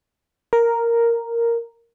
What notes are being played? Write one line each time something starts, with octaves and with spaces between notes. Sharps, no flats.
A#4